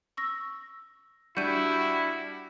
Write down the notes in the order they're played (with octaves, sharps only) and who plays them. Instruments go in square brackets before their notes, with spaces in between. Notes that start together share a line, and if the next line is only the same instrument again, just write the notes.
[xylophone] C#6 E6 A#6
[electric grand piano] G3 D4 [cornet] E4 [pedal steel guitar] F#4 [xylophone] G6 D#7